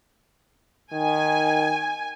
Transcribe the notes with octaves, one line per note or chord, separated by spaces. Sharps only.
D#3 G#5